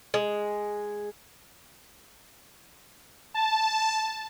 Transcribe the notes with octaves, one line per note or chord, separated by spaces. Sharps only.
G#3
A5